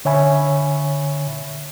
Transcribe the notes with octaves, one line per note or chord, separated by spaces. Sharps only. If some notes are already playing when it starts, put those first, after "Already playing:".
D3 C#5 E5 G#5 B5 C#6